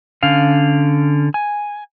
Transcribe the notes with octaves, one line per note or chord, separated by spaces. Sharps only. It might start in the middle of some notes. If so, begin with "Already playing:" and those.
D3 C#4 F5
G#5